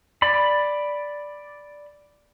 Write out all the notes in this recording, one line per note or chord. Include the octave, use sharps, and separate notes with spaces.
D5 B5